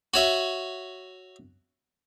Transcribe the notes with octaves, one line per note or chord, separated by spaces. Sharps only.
F#4 C#5 E5